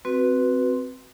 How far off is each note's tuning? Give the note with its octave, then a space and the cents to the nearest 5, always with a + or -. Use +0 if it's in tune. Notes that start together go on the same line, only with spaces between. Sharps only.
C4 +0 F#4 +0 B4 +0